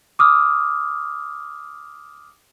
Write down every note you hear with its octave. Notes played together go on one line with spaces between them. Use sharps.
D6 D#6 F6